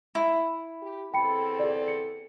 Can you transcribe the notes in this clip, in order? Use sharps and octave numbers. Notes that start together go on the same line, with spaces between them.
E4
G4
E2 C4 A4 G5 B5 C#7
G#4 D5
C#7